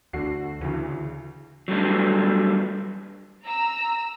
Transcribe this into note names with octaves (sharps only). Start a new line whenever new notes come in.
D2 D3 F#4 C7
D2 C#3 E3
F#3 G3 A3 D4
A#5 E6